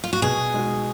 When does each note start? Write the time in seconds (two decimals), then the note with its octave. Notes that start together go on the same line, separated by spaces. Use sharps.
0.04 F4
0.13 F#4
0.22 B2 G#4
0.54 G#3 D#4 F#4